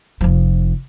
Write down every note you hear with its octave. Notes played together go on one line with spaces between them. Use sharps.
F1 F3